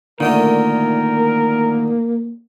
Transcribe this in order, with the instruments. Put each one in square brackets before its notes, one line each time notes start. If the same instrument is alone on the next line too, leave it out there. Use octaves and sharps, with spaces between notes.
[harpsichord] A#2 D3 A3 [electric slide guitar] D#3 [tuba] A#3 [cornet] A#4